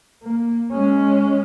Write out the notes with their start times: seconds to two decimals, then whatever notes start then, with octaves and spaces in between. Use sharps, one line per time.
0.23 A#3
0.72 G#3 C#4